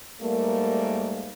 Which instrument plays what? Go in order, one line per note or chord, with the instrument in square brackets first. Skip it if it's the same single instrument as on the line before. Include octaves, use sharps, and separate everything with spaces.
[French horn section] G#2 G3 A3 A#3